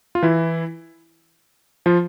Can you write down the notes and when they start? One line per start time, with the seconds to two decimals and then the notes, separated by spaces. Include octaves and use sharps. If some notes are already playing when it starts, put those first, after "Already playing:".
0.15 F4
0.22 E3 E4
1.86 F3 F4